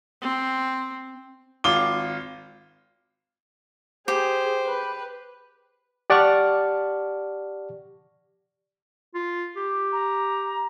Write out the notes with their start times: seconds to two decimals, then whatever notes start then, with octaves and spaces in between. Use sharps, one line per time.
0.22 C4
1.64 G#1 F4 D6 G7
4.08 G4 G#4 C5
4.66 B4
6.10 G4 D5 F#5 A5 C#6 F6
9.15 F4
9.56 G4
9.92 A#5